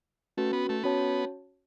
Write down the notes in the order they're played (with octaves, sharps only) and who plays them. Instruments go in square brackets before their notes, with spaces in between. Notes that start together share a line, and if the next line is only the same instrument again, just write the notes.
[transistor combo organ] A3 [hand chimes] C#4 F#4 B4
[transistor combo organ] B3
A3
[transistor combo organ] B3 [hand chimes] C#4 F#4 C#5 A5